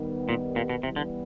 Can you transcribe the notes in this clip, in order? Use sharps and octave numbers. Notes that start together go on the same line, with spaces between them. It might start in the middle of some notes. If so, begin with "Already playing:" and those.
Already playing: D#3 G3 B3
A#2
A#2
B2
C3 E3 G3 B3
D3